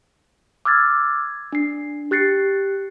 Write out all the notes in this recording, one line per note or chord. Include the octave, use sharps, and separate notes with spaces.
D6 E6 F6 G#6 A6
D4 C7
G4 F#6 A6 C7 C#7